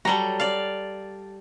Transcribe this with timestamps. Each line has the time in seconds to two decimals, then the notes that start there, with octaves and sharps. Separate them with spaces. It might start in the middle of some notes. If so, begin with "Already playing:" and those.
0.05 F#3 G3 A4 A#5
0.40 D5 F5